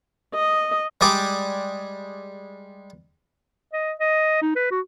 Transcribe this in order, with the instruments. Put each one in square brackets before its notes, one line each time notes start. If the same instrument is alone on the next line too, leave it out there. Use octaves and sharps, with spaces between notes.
[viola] D#5
[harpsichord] G3 G#3 G#4 D5 G5
[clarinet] D#5
D#5
D#4
B4
F#4